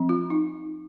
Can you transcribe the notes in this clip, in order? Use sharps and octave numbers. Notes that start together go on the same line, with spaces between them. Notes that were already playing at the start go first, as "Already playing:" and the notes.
Already playing: F3 C4
F4
D#4